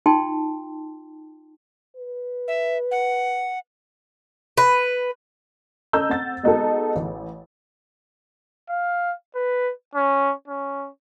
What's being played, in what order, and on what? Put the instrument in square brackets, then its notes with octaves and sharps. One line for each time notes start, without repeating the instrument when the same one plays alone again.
[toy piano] D#4 F4 G5 A5 C6
[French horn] B4
[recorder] E5
F#5
[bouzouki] B4
[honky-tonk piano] C#4 A4 D#5 A#5 E6 G6
C4 F#5 A6
G#3 B3 D#4 F#4 G#4 A4
A1
[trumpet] F5
B4
C#4
C#4